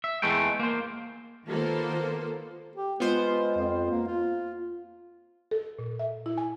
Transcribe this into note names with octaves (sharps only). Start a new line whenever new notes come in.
E5
E2 G#3 A3 B4 G5
A#3 C5
D#3 A#3 B3 F4 A4 C5
G4
G#3 B3 F4 C5
F2
A#3
F4
A4
A#2
E5
E4
G#5